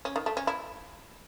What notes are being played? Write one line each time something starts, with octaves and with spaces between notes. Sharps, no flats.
C#4
D#3
A3
C#4
E4